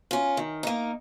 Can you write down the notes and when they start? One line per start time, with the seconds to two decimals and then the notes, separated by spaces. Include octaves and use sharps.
0.11 C#4 F4
0.37 D#3
0.63 A#3 D#4